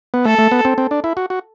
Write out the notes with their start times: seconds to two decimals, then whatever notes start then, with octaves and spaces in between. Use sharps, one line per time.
0.14 B3
0.25 A3 A4
0.38 A3
0.51 B3
0.65 C4
0.78 C4
0.91 D4
1.04 E4
1.17 F#4
1.30 F#4